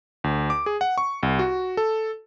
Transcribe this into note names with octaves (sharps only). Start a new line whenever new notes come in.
D2
D6
G#4
F#5
C#6
C2
F#4
A4